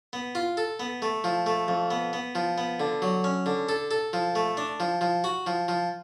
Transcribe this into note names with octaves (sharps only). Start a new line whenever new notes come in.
B3
F4
A4
B3
A3
F3
A3
F2
B3
B3
F3
B3
D3
F#3
C#4
D3
A4
A4
F3
A3
D4
F3
F3
F#4
F3
F3